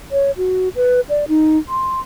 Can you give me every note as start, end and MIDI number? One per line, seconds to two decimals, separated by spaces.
0.12 0.31 73
0.37 0.69 66
0.76 1.01 71
1.09 1.25 74
1.28 1.58 63
1.69 2.00 84